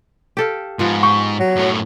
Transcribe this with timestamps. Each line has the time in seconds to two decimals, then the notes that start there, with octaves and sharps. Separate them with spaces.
0.37 G4 A4 F5
0.79 G#2 F3 B3
1.03 G4 C#6
1.40 F#3
1.57 F#2 A2